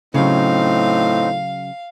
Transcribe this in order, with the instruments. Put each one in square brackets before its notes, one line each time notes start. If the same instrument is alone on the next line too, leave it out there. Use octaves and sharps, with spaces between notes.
[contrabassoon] A2 [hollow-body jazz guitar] C#3 F#3 [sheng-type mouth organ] C4 D#4 [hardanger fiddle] F5